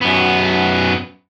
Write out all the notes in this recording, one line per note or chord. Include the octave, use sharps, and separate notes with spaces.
F#2 B3